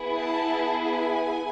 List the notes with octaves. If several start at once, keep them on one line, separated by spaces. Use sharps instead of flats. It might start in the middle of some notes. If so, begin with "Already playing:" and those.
Already playing: B3 E4 G#4
A5
G#5